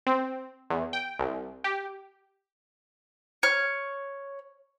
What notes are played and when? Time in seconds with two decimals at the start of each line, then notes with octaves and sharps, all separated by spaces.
0.07 C4
0.70 E2
0.93 G5
1.19 C2
1.64 G4
3.43 C#5 F6